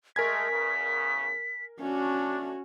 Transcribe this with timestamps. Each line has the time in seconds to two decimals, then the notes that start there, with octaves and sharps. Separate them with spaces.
0.16 G#3 A3 A#4 G#5 G#6 B6
0.50 E2 C#3
1.80 A3 C#4 D4 F#4